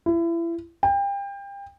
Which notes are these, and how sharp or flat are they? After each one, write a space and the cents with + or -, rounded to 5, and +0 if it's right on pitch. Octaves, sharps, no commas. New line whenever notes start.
E4 +30
G5 +30